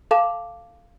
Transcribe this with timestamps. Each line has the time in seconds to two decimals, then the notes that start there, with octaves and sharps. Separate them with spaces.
0.11 A4 F5 A5 D6 E7